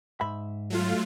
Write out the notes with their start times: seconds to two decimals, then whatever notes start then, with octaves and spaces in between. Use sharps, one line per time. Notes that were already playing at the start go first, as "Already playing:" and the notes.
0.21 G#2 E5 B5
0.70 F#3 A3 F4